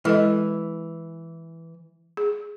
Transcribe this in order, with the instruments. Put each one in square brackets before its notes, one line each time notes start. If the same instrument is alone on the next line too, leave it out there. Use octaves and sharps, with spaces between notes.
[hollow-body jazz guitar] E3 [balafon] G#3 A4 D#5
[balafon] G#4